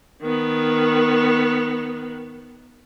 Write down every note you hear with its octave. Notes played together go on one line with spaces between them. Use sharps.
D#3 B3